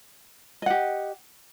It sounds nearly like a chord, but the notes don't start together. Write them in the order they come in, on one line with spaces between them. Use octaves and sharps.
D#5 F#5 G4